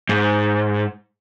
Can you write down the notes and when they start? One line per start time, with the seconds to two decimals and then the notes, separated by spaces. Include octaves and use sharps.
0.09 G#2